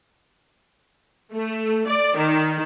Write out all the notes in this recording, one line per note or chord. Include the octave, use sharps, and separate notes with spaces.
A3
D5
D#3